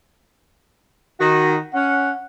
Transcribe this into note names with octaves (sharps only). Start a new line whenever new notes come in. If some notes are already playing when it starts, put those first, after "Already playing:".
D#3 F#4
C#4 F#5